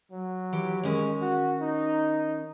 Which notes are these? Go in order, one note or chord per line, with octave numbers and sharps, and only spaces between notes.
F#3
E3 G4 G5
D#3 G#3 C#4
F#4
D#4